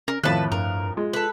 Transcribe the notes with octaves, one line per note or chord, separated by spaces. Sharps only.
C#4 A#4
F2 A2 D#3 B4 A5 F#6
G2 A#4
G#3 F4
A4 B4